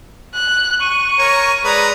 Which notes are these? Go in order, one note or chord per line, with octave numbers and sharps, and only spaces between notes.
F#6
C#6 D#7
A#4 C#5 A#5
G#3 B4 D5 A#5